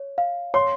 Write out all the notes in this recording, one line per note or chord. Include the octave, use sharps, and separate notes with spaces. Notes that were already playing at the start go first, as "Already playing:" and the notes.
Already playing: C#5
F5
C#5 C6